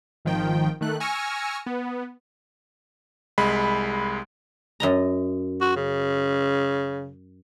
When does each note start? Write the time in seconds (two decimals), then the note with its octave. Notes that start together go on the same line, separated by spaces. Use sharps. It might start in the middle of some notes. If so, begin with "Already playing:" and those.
0.25 G#1 D#3 F3 G5
0.81 D#3 A3 F#6
1.00 G#5 C#6 E6 F6 A#6 C#7
1.66 B3
3.38 C2 G#3 B5
4.80 F#2 D#5 A#5
5.61 F#4
5.76 C#3